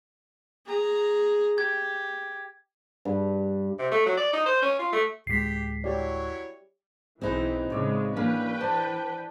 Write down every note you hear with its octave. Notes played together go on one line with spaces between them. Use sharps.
G#4 A#5
G4 G#6
G2
C3
A3
F#3
D5
D#4
C5
C#4
F4
A3
D1 G#3 G4 B6 C7
F#3 E4 G4 C#5 D5
B1 E3 C4 D#4 G#4 B4 G#5
A2 C#3 G#3 C#5 D5 E5
E3 A#3 C#4 D4 B4 G5
D4 C5 A5